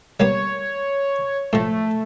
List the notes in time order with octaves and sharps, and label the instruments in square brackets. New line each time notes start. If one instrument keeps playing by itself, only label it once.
[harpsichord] G3 A#3 B3 [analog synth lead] C#5
[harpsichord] A2 F3 [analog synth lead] A3